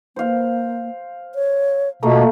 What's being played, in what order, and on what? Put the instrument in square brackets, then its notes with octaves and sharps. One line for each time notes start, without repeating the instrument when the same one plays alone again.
[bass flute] A#3 [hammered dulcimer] C5 F5
[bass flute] C#5
[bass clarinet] B2 [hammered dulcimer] A3 A#3 [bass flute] F4